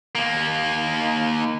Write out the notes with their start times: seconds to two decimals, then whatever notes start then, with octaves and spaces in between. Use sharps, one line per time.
0.15 D#2 A#3